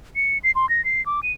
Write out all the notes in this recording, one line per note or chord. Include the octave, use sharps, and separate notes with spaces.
C#7
C7
C6
A#6
C7
D6
D#7